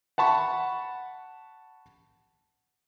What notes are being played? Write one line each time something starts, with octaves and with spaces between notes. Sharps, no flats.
F#5 A5 B5 C#6